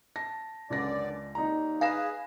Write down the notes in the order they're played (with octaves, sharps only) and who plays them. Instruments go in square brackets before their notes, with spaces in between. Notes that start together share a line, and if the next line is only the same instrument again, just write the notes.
[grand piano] A5 [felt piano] A#6
[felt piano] C#2 A#6 [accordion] F#2 D3 D5
[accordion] D#2 [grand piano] D#4 D5 A#5
[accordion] G#4 B4 [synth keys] F5 [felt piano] G#5 A#6 E7